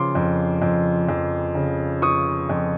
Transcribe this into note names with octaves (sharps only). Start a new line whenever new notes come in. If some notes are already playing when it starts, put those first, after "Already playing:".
Already playing: C#3 F3 C6 D6
F2
F2
F2
C#3
F3 C#6 D#6
F2